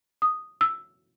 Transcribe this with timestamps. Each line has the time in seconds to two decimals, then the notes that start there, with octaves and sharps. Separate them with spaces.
0.22 D#6
0.61 E6